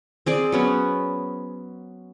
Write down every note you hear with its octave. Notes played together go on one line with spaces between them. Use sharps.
C4 G#4 D5
F#3 B3 C#4